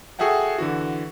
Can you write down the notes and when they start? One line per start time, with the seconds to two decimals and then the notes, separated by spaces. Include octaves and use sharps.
0.19 F#4 G#4 A4 E5 F#5 G5
0.58 D3 E3 F#4